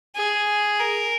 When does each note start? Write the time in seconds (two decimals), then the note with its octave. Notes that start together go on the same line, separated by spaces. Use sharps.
0.15 G#4
0.79 A#4